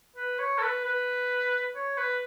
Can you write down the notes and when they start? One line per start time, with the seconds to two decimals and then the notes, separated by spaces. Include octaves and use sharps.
0.16 B4
0.39 C#5
0.58 A4
0.62 B4
0.85 B4
1.75 C#5
1.97 B4